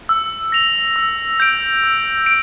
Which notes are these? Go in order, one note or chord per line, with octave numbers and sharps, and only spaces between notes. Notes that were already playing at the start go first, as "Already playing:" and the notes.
E6
A#6 F7
E6
G6 D7
E6
D7